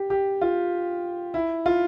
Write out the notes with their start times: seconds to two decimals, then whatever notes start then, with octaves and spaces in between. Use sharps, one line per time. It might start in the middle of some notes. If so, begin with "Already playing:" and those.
Already playing: G4
0.10 G4
0.41 F4
1.34 E4
1.66 F4